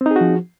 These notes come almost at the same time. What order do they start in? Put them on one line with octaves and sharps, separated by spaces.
C4 D#4 G#4 F#4 F3